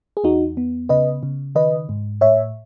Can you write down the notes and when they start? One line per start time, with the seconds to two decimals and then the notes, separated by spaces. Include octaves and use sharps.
0.17 G#4
0.24 E2 D#4 F#4
0.57 B3
0.89 C#3 B4 D#5
1.23 C#3
1.55 D#3 B4 D#5
1.89 G#2
2.21 A2 C#5 E5